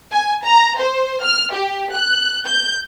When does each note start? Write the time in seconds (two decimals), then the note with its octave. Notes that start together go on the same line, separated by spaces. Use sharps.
0.12 G#5
0.45 A#5
0.80 C5
1.23 F6
1.53 G4
1.93 F#6
2.46 G6